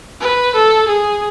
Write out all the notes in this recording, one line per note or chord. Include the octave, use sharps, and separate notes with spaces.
B4
A4
G#4